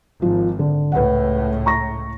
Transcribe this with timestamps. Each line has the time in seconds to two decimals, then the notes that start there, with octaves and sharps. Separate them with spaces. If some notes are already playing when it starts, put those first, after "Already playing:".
0.22 G#1 F3
0.59 D3
0.92 C#2 A2 B4 F#5
1.66 A#5 C#6 A#6